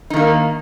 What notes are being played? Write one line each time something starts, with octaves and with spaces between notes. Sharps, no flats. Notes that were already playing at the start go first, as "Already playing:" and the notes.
D#3 A#3 D#4